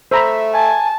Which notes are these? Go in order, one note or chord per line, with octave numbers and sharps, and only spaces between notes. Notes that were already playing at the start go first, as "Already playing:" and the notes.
A3 C5 E5 A#5 B5
G#5 A5